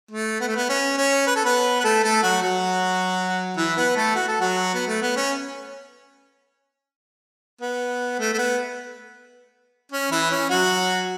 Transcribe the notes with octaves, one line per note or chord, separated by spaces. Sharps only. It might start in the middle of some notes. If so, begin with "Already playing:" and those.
A3
B3
A3
B3
C#4
C#4 C#5
B4
A4
B3 B4
B4
A3 A4
A3 A4
F#3 F#4
F#3 F#4
E3 E4
B3 B4
A3 A4
F#4
A4
F#3 F#4
B3
A3
B3
C#4
B3
A3
A3
B3
C#4
E3 E4
C#4
F#3 F#4